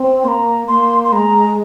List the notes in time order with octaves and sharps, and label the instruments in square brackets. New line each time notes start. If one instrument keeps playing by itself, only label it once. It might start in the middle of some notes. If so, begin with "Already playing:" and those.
Already playing: [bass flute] C4
[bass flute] A#3 [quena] A#5 C6
[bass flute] A#3 [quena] C6
[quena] C6
[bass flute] G#3 [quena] A#5